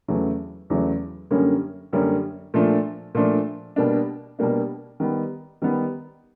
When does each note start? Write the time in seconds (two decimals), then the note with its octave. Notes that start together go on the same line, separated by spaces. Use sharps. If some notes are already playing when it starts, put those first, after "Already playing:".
0.08 E2 C#3 F#3 A3
0.70 E2 C#3 F#3 A3
1.31 F#2 D3 G3 A#3 C#4
1.93 F#2 D3 G3 A#3 C#4
2.54 A#2 F3 A3 D4
3.15 A#2 F3 A3 D4
3.76 B2 G3 A#3 D4
4.39 B2 G3 A#3 D4
5.00 D#3 G3 B3
5.62 D#3 G3 B3